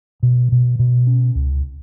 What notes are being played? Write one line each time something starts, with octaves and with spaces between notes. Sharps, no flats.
B2
B2
B2
C#4
C#2